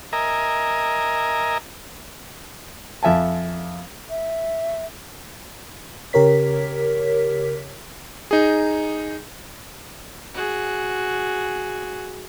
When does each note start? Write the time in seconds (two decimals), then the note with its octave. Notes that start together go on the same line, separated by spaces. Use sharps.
0.13 A#4 D#5 E5 G#5 A#5
3.03 F2 E5 G#5 A5
4.10 E5
6.13 C#3 G4 A#4 C#5 B6
8.31 D#4 G#4
10.34 F#4 G#4